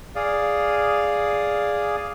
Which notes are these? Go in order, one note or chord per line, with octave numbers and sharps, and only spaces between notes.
G#4 D5 F5 D#6